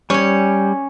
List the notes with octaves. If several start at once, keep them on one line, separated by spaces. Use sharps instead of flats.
G3 C#4 C#5